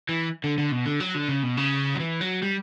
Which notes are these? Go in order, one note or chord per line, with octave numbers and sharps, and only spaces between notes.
E3
D3
D3
B2
D3
F#3
D3
C#3
B2
C#3
F#3
E3
F#3
G3